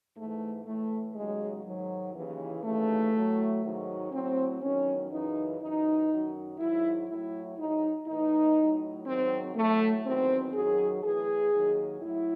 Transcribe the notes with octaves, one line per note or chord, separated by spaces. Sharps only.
G#2 E3 A3
A2 E3 A3
D#2 C#3 F#3 G#3
G#2 D#3 F#3
D#2 C#3 E3
D#2 C#3 E3 A3
A2 F#3
G#2 D#3 F#3
A2 F#3 C4
E2 D#3 F#3 C#4
F#2 C#3 E3 D#4
F#2 E3 D#4
F#2 D#3 F#3
G#2 D#3 F#3 E4
A2 F#3 E4
G#2 F#3 D#4
A2 E3 D#4
A2 F#3
G#2 D#3 F#3 C4
A2 F#3 A3
E2 D#3 F#3 C4
F#2 D#3 F#3 G#4
A2 E3 G#4
D#2 D#3 F#3
A2 F#3 E4